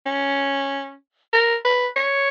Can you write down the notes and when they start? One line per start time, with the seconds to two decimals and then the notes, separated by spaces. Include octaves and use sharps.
0.06 C#4
1.33 A#4
1.65 B4
1.96 C#5